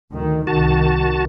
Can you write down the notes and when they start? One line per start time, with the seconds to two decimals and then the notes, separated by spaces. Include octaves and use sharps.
0.12 D2 D#3
0.47 C2 D#3 F#4 A5